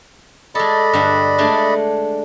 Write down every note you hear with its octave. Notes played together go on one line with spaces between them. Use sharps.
G#3 A4 D5 D#5 B5
G2 D3 B4
G#3 A3 D4